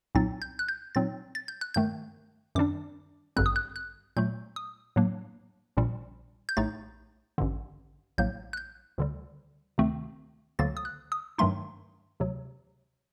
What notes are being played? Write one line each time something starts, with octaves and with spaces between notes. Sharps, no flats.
C2 A#2 F#3 C4 D#4 A6
G6
F#6
G6
A#2 F#3 C4 D#4 A6
A6
G6
F#6
G2 D#3 A3 G6
F#2 D#3 G3 D4 D6
A1 G2 D3 G3 C4 F#6
D#6
F#6
F#6
A#2 F#3 A3 G6
D#6
A2 F#3 A#3 D4
A#1 A#2 G3
G6
A#1 A2 A3 D#4 A6
A1 G2 D3
A#1 A2 F#3 A#3 G6
F#6
G6
D2 D3 G3
D2 C3 D#3 A3 C4
D2 D3 F#3 A#3 A6
D#6
F#6
D#6
G2 D#3 F#3 A3 D#4 C6
D2 C3 F#3